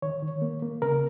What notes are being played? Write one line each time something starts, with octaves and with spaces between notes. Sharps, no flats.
D#3 C#5
D#3
A#3
A#3
C#3 A#4